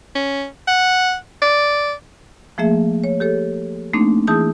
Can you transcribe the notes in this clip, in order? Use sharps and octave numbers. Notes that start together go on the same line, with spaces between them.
C#4
F#5
D5
F3 A3 A#3 G#4 E5
C#5
G4 A4 C#5
A3 A#3 C4 D4 D#4
E3 E4 G#4 A5 D#6 G6